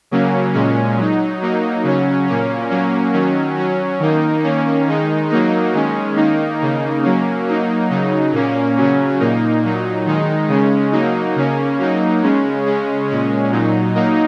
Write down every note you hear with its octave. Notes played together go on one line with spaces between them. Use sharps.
C#3 F#3 A#3 C#4
A#2 G#3 C#4
F#3 D#4
F#3 A#3 D#4
C#3 F#3 C#4
A#2 A#3 C#4
F#3 A#3 C#4
D#3 F#3 C#4
F#3 C#4
D#3 A#3 D#4
D#3 A#3 C#4
D#3 G#3 D#4
F#3 A#3 D#4
D#3 G#3 C#4
D#3 A#3 D#4
C#3 A#3 D#4
F#3 A#3 C#4
F#3 A#3 D#4
C#3 F#3 D#4
A#2 A#3 C#4
C#3 F#3 C#4
A#2 A#3 D#4
A#2 F#3 D#4
D#3 G#3 D#4
C#3 G#3 C#4
F#3 A#3 D#4
C#3 A#3 C#4
F#3 A#3 D#4
C#3 G#3 C#4
C#3 G#3 C#4
A#2 G#3 C#4
A#2 F#3 D#4
F#3 A#3 D#4